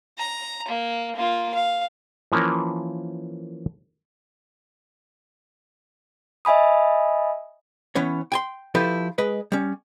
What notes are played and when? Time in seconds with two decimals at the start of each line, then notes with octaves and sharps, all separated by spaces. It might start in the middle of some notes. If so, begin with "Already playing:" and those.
0.18 A#5
0.68 A#3
1.15 A#3 F4
1.54 F5
2.32 E3 F3 A#3 C#4 A#4
6.45 D#5 E5 G#5 B5 D#6
7.95 E3 B3 C#4 C#5
8.32 G5 G#5 C6
8.75 F3 E4 G4 A4 B4
9.18 G#3 B4 D#5
9.52 G3 C#4